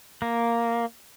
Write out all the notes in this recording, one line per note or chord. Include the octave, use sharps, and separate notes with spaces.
A#3